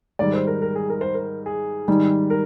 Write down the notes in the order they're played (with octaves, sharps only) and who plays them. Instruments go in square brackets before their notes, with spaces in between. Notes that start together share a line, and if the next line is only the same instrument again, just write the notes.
[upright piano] G#2 D#3 G3 [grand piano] D5
[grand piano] C5
A#4
A#4
G#4
A#4
C5
A#4
G#4
[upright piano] G#2 D#3 G3
[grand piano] A#4